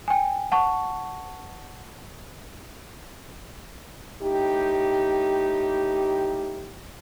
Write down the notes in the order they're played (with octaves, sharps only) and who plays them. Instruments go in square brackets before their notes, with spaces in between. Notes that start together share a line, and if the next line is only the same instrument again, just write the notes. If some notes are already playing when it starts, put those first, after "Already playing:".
[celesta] G5 G#5
F#5 A5 C#6
[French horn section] A2 D#4 G4